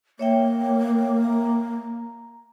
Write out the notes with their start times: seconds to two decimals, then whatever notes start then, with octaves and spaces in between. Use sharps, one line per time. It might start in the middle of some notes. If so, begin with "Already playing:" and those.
0.19 A#3 C#5 E5 G5
1.24 A#5